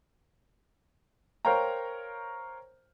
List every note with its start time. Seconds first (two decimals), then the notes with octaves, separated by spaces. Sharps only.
1.45 A#4 C5 C#5 F5 G5 A#5